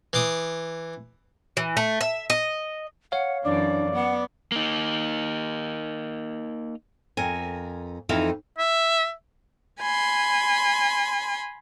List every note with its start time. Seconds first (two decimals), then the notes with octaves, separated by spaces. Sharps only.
0.13 E3 C6 D6 D#6
1.57 E3
1.77 A3
2.01 E5
2.30 D#5
3.12 C#5 F5 F#5
3.45 F#2 E3 D4 D5
3.94 B3 F#5
4.52 A#3 D#4
7.17 F2 A#4 G#5
8.09 F2 E3 D#4 E5 F5
8.59 E5
9.80 G#5 B5 C6